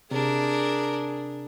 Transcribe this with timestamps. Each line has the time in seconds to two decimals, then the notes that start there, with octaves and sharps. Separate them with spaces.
0.11 C3 D4 G#4 A#4